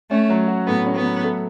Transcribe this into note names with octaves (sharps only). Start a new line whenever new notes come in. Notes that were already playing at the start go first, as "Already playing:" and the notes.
A3 C#4
F#3
F#4
A2 B3
C#4
B3
F#3
A3